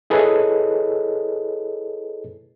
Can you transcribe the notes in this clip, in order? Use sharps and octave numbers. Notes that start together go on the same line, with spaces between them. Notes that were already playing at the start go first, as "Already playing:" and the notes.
E4 G#4 A4 B4 C#5 D#5